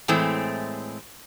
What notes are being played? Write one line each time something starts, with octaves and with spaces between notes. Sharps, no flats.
A2 E3 G#3 A3 C4